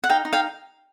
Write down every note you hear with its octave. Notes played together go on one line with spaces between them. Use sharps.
F#5
D#4 F5 G5
D#4
F5 G5